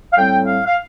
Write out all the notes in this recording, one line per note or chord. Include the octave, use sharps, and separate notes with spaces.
F5
A2 G3 C4 G5
F5
F5